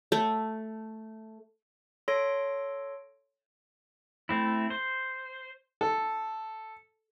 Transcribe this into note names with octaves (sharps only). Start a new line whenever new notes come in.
A3
A4 C#5 C6 A#6 D7
A3 C4 E4
C5
A4